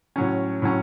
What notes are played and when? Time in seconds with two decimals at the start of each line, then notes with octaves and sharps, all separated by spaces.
0.16 A2 F#3 C#4
0.62 A2 F#3 C#4